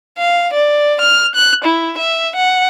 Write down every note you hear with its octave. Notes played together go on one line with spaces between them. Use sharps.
F5
D5
F6
F#6
E4
E5
F#5